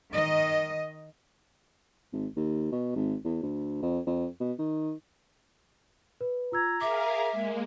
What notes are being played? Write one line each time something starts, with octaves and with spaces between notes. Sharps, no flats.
D#3 D#5
G#1
D#2
B2
G#1
E2
D2
F2
F2
B2
D#3
B4
F4 A#5 E6 G#6
G#4 A#4 E5 F5 D6
G#3 A#3